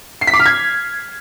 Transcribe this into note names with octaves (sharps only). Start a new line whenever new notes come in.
C7
B6
D6
F6
G#6